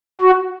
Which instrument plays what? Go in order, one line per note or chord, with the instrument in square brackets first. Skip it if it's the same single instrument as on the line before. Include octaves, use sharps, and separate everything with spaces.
[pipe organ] F#4